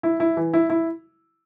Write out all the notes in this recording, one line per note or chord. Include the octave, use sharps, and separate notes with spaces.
E4
E4
E3
E4
E4